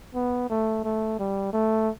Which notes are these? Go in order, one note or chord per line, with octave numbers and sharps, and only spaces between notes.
B3
A3
A3
G3
A3